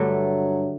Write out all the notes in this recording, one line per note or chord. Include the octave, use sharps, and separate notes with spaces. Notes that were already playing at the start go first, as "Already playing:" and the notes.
Already playing: G2 D3 F#3 A3